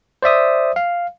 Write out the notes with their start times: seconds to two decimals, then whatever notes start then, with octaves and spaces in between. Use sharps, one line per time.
0.22 C5 D5 E5 D#6
0.76 F5